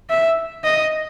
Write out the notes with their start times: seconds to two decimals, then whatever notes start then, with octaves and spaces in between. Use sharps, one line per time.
0.10 E5
0.64 D#5